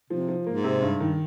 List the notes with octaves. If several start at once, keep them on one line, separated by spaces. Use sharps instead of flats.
C3 F3
F3
G#2 A#3
C3
G2
D#3